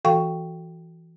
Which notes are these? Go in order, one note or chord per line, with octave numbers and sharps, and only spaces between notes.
E3 F#4 A4 F5 G5 C#6